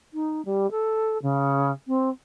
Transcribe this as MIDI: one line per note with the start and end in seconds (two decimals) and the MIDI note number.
0.14 0.44 63
0.45 0.69 55
0.71 1.18 69
1.22 1.71 49
1.88 2.09 60